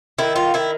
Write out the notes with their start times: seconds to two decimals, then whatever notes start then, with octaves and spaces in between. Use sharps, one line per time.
0.18 D#3 E4
0.36 F4
0.54 D#3 E4